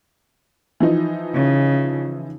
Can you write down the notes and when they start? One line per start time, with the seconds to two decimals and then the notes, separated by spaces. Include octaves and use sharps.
0.80 E3 F3 D#4
1.34 C#3